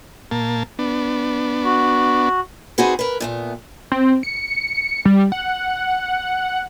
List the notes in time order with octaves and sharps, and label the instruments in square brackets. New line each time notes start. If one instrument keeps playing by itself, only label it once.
[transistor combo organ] A#2 A#3 A5
B3 D4
[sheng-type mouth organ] F#4
[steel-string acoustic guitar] C4 D#4 F#4 G#4 B4
A#4 B4
A#2 A3 B3
[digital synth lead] C4
C#7
G3
F#5